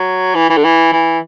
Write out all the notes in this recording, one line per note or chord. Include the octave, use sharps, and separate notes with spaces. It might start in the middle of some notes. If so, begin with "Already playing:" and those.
Already playing: F#3
E3
E3
D3
E3
E3